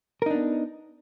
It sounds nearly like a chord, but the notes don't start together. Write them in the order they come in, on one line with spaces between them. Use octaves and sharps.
A#4 D#4 D4 B3